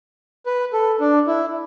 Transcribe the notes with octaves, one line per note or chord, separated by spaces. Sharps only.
B4
A4
D4
E4